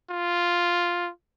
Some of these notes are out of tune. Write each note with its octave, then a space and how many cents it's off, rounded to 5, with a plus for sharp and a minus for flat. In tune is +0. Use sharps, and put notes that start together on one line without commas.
F4 +0